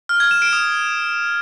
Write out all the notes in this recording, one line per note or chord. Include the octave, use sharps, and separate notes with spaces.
F6
G#6
E7
D7
D#6